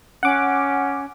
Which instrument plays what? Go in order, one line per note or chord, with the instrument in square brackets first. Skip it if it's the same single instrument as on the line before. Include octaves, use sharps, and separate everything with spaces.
[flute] C#4 [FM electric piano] F#5 D6